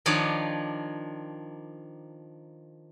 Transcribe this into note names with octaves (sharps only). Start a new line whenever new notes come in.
D#3 F3 D4 C#5 D5 G#5